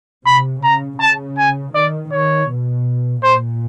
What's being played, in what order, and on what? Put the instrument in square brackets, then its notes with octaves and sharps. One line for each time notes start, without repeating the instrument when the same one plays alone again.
[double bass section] C3 [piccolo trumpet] B5
[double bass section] C#3 [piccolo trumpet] A#5
[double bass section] C#3 [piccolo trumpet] A5
[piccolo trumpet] G#5
[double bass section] D#3 [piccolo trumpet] D5
[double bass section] D#3 [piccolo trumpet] C#5
[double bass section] B2
[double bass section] A#2 [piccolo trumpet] C5